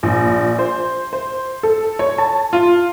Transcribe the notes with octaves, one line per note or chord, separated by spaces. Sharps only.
A#1
C5
C5
A4
C#5
A5
F4